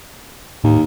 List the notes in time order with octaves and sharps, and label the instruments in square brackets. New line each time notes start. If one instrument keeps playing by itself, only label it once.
[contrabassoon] D#2 [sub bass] A2